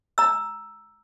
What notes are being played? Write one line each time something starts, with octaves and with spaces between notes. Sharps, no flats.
A#5 E6